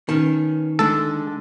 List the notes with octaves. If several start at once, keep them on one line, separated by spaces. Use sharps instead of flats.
D#3 B3 C#4 A5
D3 G#3 D4 A4